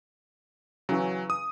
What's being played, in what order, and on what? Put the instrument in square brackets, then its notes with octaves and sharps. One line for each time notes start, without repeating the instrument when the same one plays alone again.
[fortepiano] C#3 E3 [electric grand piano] F#3
[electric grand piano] D#6